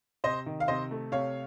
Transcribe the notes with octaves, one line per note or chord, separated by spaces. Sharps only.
C3 C5 D#5
D#3
F5
C3 C5 D#5
A3
C3 C#5 F5